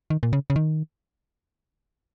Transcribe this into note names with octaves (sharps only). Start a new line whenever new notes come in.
D#3
A#2
C#3
C#3
D#3